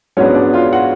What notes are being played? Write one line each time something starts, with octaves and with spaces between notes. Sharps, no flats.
G#2 F#3 B3 C#4 D4 C#5
D4 D5
F4 F5
F#4 F#5